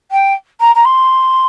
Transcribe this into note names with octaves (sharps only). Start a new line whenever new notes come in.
G5
A#5
A#5
C6